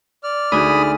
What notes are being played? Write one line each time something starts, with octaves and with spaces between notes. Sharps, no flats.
D5 F6
D2 D#4 F#4 G#4 G#5 B5 D#6